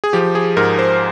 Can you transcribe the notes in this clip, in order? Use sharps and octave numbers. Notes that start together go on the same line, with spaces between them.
G#4
F3 G4
G#4
G#2 A#4
C5